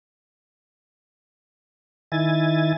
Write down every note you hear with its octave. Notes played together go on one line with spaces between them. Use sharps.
D#3 E4 G#5 A6